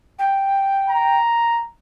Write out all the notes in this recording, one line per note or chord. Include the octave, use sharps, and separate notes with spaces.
G5
A#5